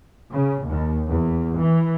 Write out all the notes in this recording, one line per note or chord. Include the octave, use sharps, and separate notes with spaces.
C#3
D#2
E2
E3